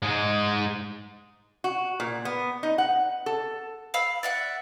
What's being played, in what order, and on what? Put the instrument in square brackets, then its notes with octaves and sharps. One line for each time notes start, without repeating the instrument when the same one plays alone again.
[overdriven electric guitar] G#2 G#3
[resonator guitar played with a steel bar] F#4
A#2
B3
D#4
F#5
A4
[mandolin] F5 B5 E6
D5 E5 F#5